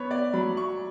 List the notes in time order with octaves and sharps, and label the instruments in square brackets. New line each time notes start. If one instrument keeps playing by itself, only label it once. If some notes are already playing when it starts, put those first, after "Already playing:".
Already playing: [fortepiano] B3 [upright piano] C#5
[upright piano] D5
[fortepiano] F#3 [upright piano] B5
[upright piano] C#6